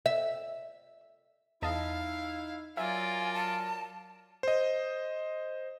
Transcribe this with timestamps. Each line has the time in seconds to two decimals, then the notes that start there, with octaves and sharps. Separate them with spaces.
0.06 E5
1.62 E2 D#4 E4 D#5 F5 A5
2.77 F#3 F4 A#4 D5 E5 G#5
3.34 A5
4.43 C5 D#5